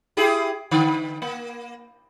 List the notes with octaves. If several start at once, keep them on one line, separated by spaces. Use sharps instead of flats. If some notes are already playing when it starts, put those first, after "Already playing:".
E4 G4 G#4
D3
A#3